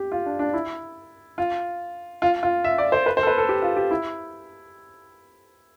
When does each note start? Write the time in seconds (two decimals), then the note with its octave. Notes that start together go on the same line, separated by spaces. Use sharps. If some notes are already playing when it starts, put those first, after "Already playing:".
Already playing: G4
0.12 F4
0.26 D4
0.39 D4
0.54 E4
1.38 F4
2.22 F4
2.43 F4
2.64 E5
2.78 D5
2.92 C5
3.06 B4
3.17 C5
3.23 A4
3.27 B4
3.38 A4
3.49 G4
3.62 F4
3.77 G4
3.91 E4